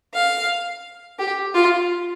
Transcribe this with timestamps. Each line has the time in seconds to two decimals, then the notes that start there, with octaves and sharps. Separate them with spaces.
0.14 F5
1.19 G4
1.54 F4